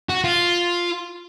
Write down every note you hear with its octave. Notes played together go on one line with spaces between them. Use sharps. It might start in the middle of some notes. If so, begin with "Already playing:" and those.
F#4
F4